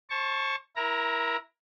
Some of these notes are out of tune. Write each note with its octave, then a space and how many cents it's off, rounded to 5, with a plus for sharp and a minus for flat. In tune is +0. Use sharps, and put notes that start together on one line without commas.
C5 +40 A5 -10 C#6 +0
E4 +0 A#4 +25 A#5 +0